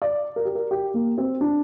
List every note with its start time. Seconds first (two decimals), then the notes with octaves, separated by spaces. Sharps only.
0.02 D5
0.36 A#4
0.45 G4
0.55 A#4
0.71 G4
0.94 A#3
1.18 C4
1.41 D4